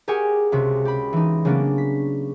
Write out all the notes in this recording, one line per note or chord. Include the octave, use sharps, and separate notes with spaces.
G4 G#4 A#4 C#5 F#5 G#5
C#2 C3 F#4
G4 B5
E3 D#4
C#3 F#3 A#3 B3 C#4 D4
B6